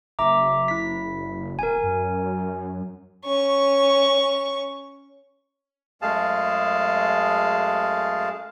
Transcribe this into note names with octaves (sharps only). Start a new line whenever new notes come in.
F#1 E5 A#5 D6
E4 B6
E1 A#4 G#5
F#2
C#4 C#6
F#2 G#3 A3 G#4 F5 A5